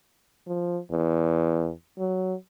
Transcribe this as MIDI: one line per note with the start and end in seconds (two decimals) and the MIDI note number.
0.47 0.78 53
0.92 1.71 40
1.98 2.34 54